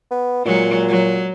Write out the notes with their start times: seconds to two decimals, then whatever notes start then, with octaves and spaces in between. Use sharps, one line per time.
0.11 B3
0.45 A#2 F#3 G#3
0.89 F#3